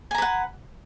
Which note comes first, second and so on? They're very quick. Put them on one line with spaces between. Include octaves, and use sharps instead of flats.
G#5 A#5 B4 F#5